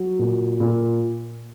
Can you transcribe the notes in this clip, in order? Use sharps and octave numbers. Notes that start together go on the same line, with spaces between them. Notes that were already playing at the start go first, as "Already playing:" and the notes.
Already playing: F#3
A#2
A#2